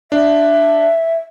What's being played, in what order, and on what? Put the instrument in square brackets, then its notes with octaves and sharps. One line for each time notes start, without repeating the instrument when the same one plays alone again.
[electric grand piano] D4 [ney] E5